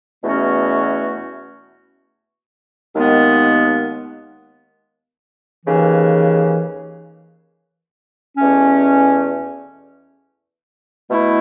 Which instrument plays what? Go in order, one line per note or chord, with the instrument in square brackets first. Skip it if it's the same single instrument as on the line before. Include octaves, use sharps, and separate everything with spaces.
[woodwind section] E2 B2 A3 C#4 F#4
D#2 D#3 G#3 B3
D#2 C#3 E3
E2 B2 A3 C#4
B2 A3 E4